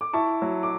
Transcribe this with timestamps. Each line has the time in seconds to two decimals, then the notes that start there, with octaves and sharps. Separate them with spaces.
0.01 D6
0.13 E4 A5 C#6
0.42 F#3
0.63 D6